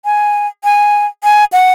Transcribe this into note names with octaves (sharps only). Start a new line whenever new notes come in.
G#5
G#5
G#5
F#5